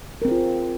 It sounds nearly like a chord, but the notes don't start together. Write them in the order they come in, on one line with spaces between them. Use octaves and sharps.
A#4 C4 G#4 F4